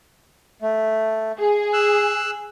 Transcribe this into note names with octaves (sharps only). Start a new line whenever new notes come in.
A3
G#4
E6 F#6